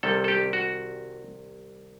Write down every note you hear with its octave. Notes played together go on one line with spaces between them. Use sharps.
C2 C3 D#3 G3 A4
A4
G4
F#4